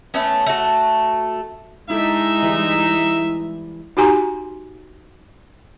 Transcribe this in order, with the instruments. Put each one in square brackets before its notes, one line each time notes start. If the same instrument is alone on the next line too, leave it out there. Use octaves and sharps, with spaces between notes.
[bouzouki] A3 B3 C#4
A3 F#4
[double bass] G#3 [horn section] D#4 E5 [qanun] E4 A4 D5
[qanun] E3 G3
[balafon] D#4 F#4 G4 G#5 A#5 C6